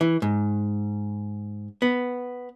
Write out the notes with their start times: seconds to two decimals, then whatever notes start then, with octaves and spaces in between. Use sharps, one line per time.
0.01 E3
0.22 G#2
1.82 B3